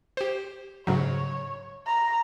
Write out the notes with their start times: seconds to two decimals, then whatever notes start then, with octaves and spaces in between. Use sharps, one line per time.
0.17 G4 C5
0.87 G#2 C#3 F#3 C#5
1.87 A#5